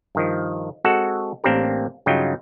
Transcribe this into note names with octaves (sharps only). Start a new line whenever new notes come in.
G2 D#3 F3
G#3 C4 F#4 A4 F#5
A1 A#3 C4 D4 G4 A#4
G2 C#3 F#3 D#4 F4 G5